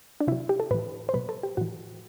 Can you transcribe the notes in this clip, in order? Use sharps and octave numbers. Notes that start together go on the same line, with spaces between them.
D4
C3 F#3 E4
G4
A4
A2 E3 B4
C5
B2 F#3 B4
A4
G4
A2 E3 F#4